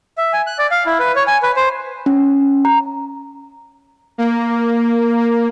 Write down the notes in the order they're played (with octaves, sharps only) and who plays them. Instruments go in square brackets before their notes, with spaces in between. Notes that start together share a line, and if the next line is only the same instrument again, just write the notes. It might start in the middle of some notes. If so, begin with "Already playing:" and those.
[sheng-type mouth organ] E5
G#5
F#6
D5
F5
E4
B4
C#5
G#5
B4
C5
[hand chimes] C#4
A#5
[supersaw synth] A#3